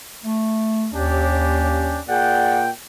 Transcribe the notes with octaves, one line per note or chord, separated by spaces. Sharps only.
A3
D#2 C#4 D4 G4
A#2 G#4 D5 F#5 G5